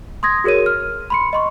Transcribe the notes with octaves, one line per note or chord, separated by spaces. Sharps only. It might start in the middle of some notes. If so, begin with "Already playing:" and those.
C6 D#6 G#6 A#6
F#4 G#4 A#4 C#5 D#7
F6
B5 C6 C#7
D#5 C6 C#6